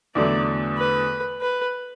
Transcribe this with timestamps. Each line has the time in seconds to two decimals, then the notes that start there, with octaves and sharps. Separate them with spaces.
0.15 E2 D3 F#3 A3 D5
0.78 B4
1.41 B4